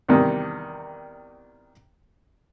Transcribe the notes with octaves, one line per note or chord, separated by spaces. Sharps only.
E2 C3 D#3 G3